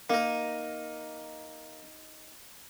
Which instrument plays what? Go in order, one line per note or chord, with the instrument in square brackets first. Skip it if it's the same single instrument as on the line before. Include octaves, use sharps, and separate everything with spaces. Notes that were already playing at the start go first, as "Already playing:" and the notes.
[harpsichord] A#3 A#4 [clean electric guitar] D#4